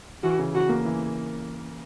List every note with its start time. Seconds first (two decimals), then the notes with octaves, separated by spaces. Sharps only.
0.23 E3 F#4
0.39 C#3
0.55 C#3 F#4
0.69 A#3
0.85 E3